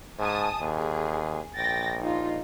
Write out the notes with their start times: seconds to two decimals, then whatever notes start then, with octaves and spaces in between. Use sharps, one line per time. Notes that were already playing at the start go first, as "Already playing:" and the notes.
0.19 G#2 G#5 A5 D#6
0.61 D#2 G#4
1.57 A#1 G5 A6 A#6
2.02 D#4 F4